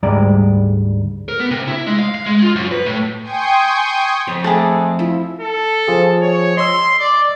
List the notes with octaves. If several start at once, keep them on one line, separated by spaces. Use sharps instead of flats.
D2 G#2 G3 G#3 D5 A#5
A#4
B3
C3
E4
G#3
F5
F5
G#3
F4
F#2
B4
A2
G5 G#5 C6 C#6 D#6 G6
F2 C#5
A3 G#4 F#5 A5 D6
F3 E4
A4
F3 F4 G#4
C#5
D#5 C6 E6
D5